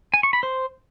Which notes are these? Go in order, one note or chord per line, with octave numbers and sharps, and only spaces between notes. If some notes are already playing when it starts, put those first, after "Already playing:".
G#5
C#6
B5
C5